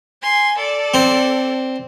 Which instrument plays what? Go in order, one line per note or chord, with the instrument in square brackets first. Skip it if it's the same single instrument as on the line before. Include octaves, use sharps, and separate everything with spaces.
[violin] G#5 C6
A4 D5
[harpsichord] C4